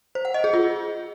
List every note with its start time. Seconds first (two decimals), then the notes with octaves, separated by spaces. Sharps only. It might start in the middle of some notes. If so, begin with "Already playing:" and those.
0.15 C5
0.25 F#5
0.34 D#5
0.44 G#4
0.53 F4